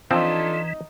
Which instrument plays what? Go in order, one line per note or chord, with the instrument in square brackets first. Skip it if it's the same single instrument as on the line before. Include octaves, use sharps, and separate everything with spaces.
[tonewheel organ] E3 [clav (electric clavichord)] F3 C4 [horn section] D4 F4 A4 [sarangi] D#4